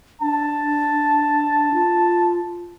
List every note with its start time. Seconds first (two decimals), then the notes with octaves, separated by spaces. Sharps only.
0.22 D4 A5
1.74 F4